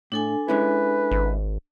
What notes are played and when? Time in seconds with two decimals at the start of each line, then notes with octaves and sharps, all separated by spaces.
0.12 A2 D4 A4 G#5
0.48 G#3 C#4 E4 B4
1.11 G#1